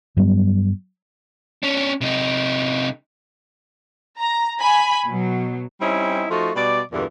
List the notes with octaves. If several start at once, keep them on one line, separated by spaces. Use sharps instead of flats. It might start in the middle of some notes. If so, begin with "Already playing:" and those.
G2 F#3 G3 B3
C#4 D4
C3 D#4
A#5
G#5 B5
B2 F#3
G3 C4 C#4 D#4 E4
F3 A3 D#4 F4 F#4
B2 G3 D5
E2 G2 A#2 D3 E3